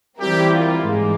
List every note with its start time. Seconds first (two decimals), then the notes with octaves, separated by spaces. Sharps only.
0.19 E3 G3 C4 E4 G4 A#4
0.53 F4
0.85 G#2 E3 G#3 A#3